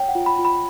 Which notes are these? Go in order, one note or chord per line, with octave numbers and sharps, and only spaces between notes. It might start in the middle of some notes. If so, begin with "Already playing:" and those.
Already playing: C#5 G5
F#5
F4
B5
F4
B5